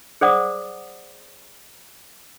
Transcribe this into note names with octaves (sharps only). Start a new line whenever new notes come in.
G#4 C5 D5 F#5 D6 D#6